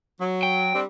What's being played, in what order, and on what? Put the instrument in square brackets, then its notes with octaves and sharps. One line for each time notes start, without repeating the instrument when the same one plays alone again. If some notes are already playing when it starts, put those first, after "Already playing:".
[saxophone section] F#3
[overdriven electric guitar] G5
[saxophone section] G3 C4 D4